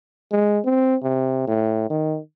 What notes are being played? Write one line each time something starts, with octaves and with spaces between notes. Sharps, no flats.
G#3
C4
C3
A2
D#3